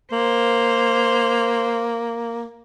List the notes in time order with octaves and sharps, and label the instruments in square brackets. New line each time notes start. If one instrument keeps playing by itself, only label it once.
[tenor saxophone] A#3 [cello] C5